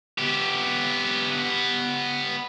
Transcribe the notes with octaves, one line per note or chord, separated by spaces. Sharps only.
B3 G4